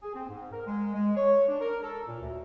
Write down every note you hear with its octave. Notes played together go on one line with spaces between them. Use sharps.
G#4
C4
G#2
A#4
G#3
G#3
C#5
D4
A#4
A4
A#2
D2